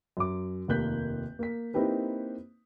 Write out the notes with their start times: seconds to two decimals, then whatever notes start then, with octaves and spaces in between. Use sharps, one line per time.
0.17 F#2 D6
0.68 F1 D#2 A#3 F#6 G6 B6
1.39 A#3 B6
1.74 A#3 C4 D#4 E4 G4 B4